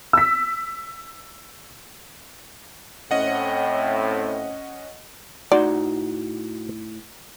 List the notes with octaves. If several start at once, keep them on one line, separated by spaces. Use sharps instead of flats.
E6 B6
A2 C4 C#4 D#5 F#5
A2 D#4 F#4 D5 C6